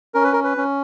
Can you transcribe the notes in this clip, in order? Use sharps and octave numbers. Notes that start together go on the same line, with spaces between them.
C#4 A#4
B4
A#4
B4
C#4